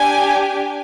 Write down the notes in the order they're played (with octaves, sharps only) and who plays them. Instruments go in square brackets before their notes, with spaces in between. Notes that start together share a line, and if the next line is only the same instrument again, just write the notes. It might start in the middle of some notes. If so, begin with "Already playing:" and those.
Already playing: [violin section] D4 G4 G#5